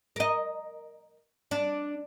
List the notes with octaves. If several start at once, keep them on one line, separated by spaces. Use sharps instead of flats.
A#4 D#5
D4